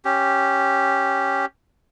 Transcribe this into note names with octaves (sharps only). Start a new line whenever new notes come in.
C#4 G4